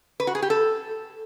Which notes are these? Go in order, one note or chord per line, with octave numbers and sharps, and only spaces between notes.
B4
F#4
G#4
G4
A4